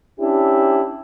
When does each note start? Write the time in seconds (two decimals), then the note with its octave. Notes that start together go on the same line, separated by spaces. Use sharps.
0.20 C#4 D4 E4 G4